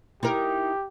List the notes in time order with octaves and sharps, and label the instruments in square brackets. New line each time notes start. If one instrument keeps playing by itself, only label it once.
[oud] D#4 E4 A#4 [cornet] G4